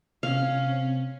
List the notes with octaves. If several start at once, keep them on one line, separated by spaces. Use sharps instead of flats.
C3 C4 C#4 F5